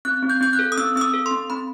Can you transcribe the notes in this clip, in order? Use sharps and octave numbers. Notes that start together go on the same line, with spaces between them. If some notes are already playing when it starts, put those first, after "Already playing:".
C4 F#6
C4
G6
C4 G6
F#6
A4
D#6
C4 E6
C4 E6
D#6
A4
C4 C6
C4 B5